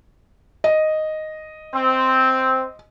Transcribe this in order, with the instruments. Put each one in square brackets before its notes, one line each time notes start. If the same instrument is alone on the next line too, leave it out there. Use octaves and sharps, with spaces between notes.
[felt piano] D#5
[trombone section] C4